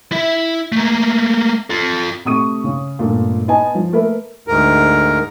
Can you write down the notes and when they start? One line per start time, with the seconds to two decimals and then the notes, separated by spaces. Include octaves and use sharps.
0.12 E4 E5
0.72 A3 A#3
1.70 F4 A4
2.25 C3 A3 C#6 D#6 D#7
2.64 C#3
2.99 G1 A#2 A3
3.48 B3 D#5 G#5 A5
3.75 F3
3.92 A3 A#3 A#4 B4 E5
4.48 D2 G#2 A#4